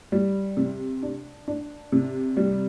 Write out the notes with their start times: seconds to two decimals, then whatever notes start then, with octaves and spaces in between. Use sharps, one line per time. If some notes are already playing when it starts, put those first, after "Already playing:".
0.12 G3
0.57 C3
1.03 D4
1.48 D4
1.92 C3
2.37 G3